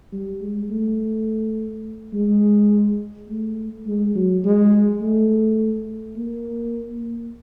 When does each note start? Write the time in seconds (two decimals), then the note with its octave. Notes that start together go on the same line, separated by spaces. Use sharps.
0.13 G3
0.40 G#3
0.70 A3
2.14 G#3
3.28 A3
3.87 G#3
4.15 F#3
4.44 G#3
5.01 A3
6.16 A#3